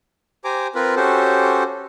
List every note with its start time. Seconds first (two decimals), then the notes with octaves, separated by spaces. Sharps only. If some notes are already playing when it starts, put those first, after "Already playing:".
0.44 G4 C5 G#5 A#5 D6
0.75 C4 F4 A#4 B4
0.96 C#4 F#4 G4 A4 C5